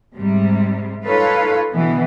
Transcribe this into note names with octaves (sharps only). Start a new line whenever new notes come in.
G#2 C3 G3
D#4 F4 A4 B4 C#5 F5
B2 D3 E3 F#3 B3